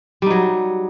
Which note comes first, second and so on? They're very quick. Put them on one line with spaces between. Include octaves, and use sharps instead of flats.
G3 D#4 F#3